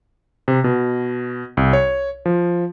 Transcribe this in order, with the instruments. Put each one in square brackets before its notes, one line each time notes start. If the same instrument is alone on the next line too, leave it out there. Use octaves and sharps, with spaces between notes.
[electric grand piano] C3
B2
C2
C#5
F3